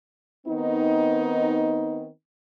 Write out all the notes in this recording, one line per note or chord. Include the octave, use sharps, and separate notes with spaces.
D#3 B3 C4 D#4